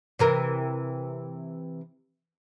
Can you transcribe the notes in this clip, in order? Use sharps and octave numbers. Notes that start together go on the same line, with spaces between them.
C3 E3 A#4